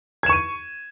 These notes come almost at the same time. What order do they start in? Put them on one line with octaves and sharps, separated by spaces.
G#6 E7 C#6 D#7